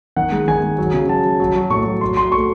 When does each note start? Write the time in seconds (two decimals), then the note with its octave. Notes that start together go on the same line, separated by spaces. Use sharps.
0.16 D#3 F#5
0.32 G#3
0.48 D#3 G#5
0.63 G#3
0.78 F#3
0.94 C#3
1.09 F#3 A5
1.25 F#3
1.40 F#3
1.56 F#3
1.70 A2 C#6
1.86 F#3
2.01 F#3 C6
2.17 F#3 C6
2.32 A3 C#6